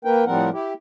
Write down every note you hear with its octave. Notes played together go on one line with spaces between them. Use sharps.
A#3 A#4 B4 G5
A2 F3 G3 C4 A#4 F#5
E4 G4